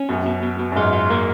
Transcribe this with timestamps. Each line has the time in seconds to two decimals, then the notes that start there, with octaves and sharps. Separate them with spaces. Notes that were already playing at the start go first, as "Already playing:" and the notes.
Already playing: C#4
0.09 F#2 B2
0.26 B2
0.43 B2
0.59 B2
0.72 F#2
0.76 G#2 F4
0.93 F4
1.10 A#3